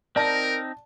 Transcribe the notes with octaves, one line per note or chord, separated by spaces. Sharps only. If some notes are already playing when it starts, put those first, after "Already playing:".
C4 D#4 A#4 D5 A5